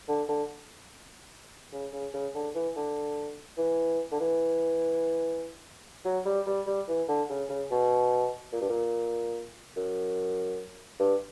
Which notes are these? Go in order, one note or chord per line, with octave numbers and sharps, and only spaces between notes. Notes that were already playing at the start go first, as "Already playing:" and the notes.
D3
D3
C#3
C#3
C#3
D3
E3
D3
E3
D3
E3
F#3
G3
G3
G3
E3
D3
C#3
C#3
B2
A#2
G2
A#2
F#2
G2